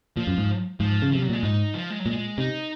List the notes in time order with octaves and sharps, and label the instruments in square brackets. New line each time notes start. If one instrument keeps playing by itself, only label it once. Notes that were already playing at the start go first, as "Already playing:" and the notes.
[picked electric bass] A#2 [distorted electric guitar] F3
[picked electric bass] F#2
G#2
[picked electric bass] G#2 [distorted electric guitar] F3
[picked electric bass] C#3
[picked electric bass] C3 [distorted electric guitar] F3
[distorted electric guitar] F#3
[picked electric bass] A#2 [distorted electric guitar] G#3
[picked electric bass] G#2 [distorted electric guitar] D#4
[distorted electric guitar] F3
G#3
F#3
[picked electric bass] A#2 [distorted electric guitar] G#3
[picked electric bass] C3 [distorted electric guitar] D#4